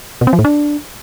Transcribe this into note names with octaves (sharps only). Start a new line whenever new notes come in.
B2
C4
F3
A2
D4